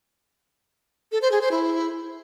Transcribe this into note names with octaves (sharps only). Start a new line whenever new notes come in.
A4
C5
G#4
C5
E4